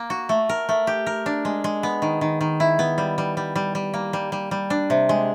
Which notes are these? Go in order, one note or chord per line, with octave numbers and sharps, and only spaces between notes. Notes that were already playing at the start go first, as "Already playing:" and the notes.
Already playing: A#3
F#4
A3
A#4
A3
G4
A#4
D4
G#3
G#3
B3
D#3
D#3
D#3
E4
B3
G3
G3
G3
G3
G3
A#3
G3
G3
G3
D4
C3
G#3